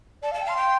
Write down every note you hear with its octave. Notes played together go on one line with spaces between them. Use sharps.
D5 A5
F5
A5
G5
F5 C6
G5